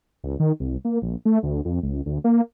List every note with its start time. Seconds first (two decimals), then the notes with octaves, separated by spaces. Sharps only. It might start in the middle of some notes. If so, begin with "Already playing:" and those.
0.24 C#2
0.40 D#3
0.60 C2
0.85 A#3
1.02 A#1
1.25 A3
1.43 D2
1.65 F2
1.83 C#2
2.06 D2
2.24 A#3